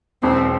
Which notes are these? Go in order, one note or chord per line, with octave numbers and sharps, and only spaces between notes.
E1 C4